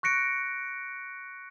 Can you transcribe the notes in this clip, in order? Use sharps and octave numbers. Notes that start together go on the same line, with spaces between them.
C#6 F#6 A#6 C#7 D7